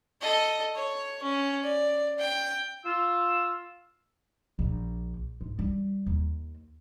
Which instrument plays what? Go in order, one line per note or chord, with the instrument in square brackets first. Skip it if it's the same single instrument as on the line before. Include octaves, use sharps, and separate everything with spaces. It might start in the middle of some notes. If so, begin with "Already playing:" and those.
[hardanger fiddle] A4 D#5
C#5
C#4
D5
G5
[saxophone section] F4 [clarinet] E6
[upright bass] A#1
G#2
G3
D#2